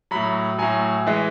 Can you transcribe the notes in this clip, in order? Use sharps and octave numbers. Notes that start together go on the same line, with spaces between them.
A2 F#3 B5
A2 F#3 G#5
E3 G#3